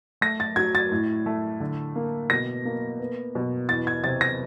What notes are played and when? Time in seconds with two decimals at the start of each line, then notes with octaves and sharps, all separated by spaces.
0.21 A3 A#6
0.40 A6
0.56 F#3 G#6
0.75 A6
0.92 A2
1.26 A3
1.60 D3
1.96 A#3
2.30 B2 A#6
2.65 A#3
3.00 B3
3.35 B2
3.69 E2 A6
3.87 G#6
4.04 C3 A6
4.21 A#6